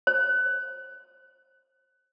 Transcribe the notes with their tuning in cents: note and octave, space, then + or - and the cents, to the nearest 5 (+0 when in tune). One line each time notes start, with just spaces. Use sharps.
C5 +25